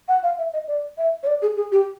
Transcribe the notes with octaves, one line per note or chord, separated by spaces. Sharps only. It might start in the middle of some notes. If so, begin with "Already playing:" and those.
F#5
F5
E5
D#5
D5
E5
C#5
D5
G#4
G#4
G4